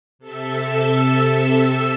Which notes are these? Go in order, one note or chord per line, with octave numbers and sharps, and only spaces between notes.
C3 A4 E5 E6